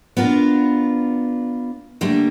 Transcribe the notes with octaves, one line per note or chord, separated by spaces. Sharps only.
B3 D4 F4 A#4
D3 G3 A3 A#3 G4